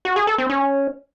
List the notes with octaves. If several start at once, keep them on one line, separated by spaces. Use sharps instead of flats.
F#4
G#4
A4
C4
C#4